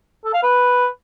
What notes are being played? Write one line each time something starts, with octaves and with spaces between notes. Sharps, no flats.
A4
F5
B4